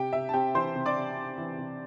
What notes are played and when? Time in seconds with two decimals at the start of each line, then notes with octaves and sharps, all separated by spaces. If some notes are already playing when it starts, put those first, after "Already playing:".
Already playing: C3 G4 G5
0.13 C3 E5
0.29 A5
0.33 C4 G4 G5
0.55 E3 C5 C6
0.76 C3
0.86 D5 D6
0.96 C3
1.17 C4
1.38 E3
1.58 C3